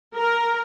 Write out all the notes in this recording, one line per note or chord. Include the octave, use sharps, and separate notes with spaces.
A#4